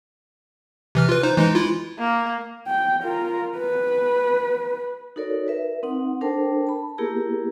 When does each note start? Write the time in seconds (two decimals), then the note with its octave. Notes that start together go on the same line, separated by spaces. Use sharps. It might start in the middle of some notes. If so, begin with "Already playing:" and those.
0.95 C3 E3 F6
1.09 F4 B4
1.23 D#4 C5
1.37 E3 G#3 D#4
1.55 E4 F4
1.99 A#3
2.68 G5
3.03 F4 A#4
3.58 B4
5.16 D#4 F#4 A4 A#4 C#5 D5
5.47 A#4 B4 E5
5.83 C4 D#4 F#5
6.21 D4 A4 A#4 C5 G5 A5
6.67 A5 B5
6.98 A#3 B3 E4 G4 G#4 A#4